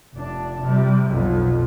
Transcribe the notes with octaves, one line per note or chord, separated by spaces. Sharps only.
F1 D4
C3 G3
B1 F2